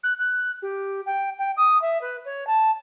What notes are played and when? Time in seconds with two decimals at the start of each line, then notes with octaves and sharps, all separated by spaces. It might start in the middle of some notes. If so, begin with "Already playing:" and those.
0.03 F#6
0.19 F#6
0.62 G4
1.06 G5
1.38 G5
1.57 D#6
1.81 E5
2.01 B4
2.25 C#5
2.47 A5